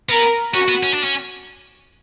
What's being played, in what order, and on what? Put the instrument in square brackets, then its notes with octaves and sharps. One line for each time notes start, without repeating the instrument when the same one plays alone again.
[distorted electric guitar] B3 [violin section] A#4
[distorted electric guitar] C#4 [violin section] F#4
[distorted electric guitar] B3
C#4
D4
C#4